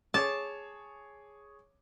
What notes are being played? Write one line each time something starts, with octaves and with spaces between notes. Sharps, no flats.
G#4 C#5 A5 D6